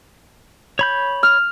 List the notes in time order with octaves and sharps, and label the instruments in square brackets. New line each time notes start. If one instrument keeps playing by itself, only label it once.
[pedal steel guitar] C#5 B5 G6
[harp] F6